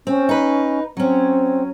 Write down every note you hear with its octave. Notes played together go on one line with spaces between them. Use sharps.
C4 C#4
D#4 B4
F#3 C4 C#4